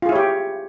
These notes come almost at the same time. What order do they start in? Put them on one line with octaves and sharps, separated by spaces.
F4 G#4 E4 C#5 G4